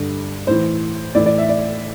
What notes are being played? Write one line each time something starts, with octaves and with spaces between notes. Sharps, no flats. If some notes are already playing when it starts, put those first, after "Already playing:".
Already playing: G2 D3
A2 E3 C5
A2 E3 D5
D5
E5
D5